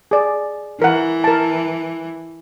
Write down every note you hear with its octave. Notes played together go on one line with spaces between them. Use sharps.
G#4 D5
E3 A#4 F#5
A#4 A5